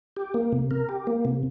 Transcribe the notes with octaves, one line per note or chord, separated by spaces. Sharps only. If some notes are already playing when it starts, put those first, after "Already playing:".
G4
A#3
C3
A#4
G4
A#3
C3